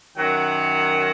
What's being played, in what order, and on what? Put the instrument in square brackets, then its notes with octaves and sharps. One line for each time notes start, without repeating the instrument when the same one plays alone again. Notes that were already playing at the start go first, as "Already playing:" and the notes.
[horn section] F#2 D#3 F#3 F#5